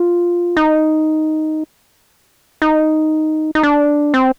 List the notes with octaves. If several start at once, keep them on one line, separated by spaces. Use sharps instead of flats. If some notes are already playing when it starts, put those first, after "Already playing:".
Already playing: F4
D#4
D#4
D#4
D4
C4